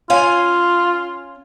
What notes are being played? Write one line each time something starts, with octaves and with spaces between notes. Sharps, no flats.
C#4 F4 F5 G#5